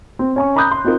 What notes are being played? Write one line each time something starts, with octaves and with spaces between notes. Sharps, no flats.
C4
C#4 G#5 C#6
A#5 B5 D6 D#6 F#6 G6
C6
C4 D#4 F4 A#4